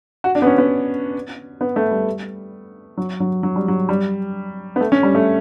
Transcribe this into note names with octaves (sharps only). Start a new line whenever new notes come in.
F#4
D4
B3
C#4
B3
B3
A3
G3
F#3
F#3
F#3
G3
F#3
G3
B3
A3
C#4
G3
A3